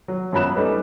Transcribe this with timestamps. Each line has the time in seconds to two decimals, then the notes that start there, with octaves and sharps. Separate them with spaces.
0.08 F#3
0.33 F#2 F3 F#3 B5 F#6 E7
0.56 G3 A3 C#4 D#4 B4